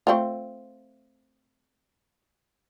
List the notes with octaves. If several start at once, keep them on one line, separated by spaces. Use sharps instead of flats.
A3 C4 F4